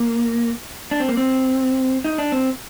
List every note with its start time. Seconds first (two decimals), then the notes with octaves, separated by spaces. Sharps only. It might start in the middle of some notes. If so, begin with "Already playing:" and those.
Already playing: A#3
0.91 D4
1.00 C4
1.09 A#3
1.17 C4
2.04 D#4
2.18 D4
2.32 C4